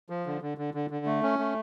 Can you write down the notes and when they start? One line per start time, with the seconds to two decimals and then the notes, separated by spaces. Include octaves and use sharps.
0.10 F3
0.26 D3
0.42 D3
0.58 D3
0.74 D3
0.90 D3
1.06 A3
1.23 C#4
1.39 A3